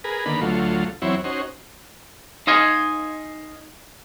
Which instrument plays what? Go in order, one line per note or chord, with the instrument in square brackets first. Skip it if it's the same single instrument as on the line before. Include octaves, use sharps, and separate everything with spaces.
[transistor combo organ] G#4 A#4 B4
D3 D#3 A#3 B4 B5
D2 F#3 A3 F4
E2 F#3 C4 E4 C#5
C#4 D#4 F#4 C5
[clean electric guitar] D#4 C5 D#5 F5 G#5